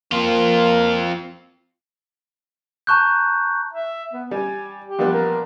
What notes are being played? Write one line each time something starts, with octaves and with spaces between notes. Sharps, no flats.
A#3 C4 F4
A5 A#5 C#6 F#6 G6
E5
B3
G3 G#5
G4
A#1 G3 B3
A#4